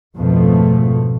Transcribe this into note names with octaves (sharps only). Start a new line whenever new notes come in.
G#1 F2 B2 F3 A3